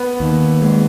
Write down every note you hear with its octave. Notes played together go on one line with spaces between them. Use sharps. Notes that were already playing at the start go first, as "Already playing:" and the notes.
Already playing: B3
D#2
G#3